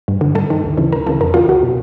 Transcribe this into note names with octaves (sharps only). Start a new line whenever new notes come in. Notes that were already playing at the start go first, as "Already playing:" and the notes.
G2
D3
G2 A4
D#3
D2
C#3 E3
D2 A#4
C#3 E3 A4
F2 A#4
C#3 E3 F4
C#2 F#4
B2